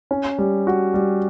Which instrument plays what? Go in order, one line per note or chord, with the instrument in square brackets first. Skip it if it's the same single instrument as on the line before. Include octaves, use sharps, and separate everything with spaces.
[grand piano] C#4
G3
F#4
G3